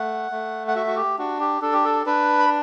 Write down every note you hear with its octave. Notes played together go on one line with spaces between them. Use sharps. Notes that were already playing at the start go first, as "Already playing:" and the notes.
Already playing: A3 F#5
A3
F#5
F#4 E5
F#4
G4
D4 F#4
G4
D4 A4
G4
A4
D4 B4
B5